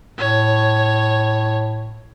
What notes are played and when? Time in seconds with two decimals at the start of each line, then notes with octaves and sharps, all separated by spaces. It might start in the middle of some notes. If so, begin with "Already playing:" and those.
0.19 A2 C#5